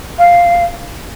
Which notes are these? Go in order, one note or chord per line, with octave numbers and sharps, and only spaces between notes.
F5